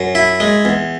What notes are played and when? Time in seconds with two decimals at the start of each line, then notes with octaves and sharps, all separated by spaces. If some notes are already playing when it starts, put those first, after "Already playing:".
Already playing: F#2
0.15 E4
0.40 G#3
0.65 E2